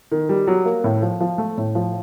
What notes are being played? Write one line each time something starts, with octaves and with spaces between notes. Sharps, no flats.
D#3
G3
F#3
A#3
A2
F3
F3
A3
A2
F3